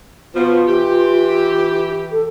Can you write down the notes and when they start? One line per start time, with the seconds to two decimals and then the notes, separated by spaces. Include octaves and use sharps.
0.34 B2 F3 F4
0.67 E3 G4
2.11 A4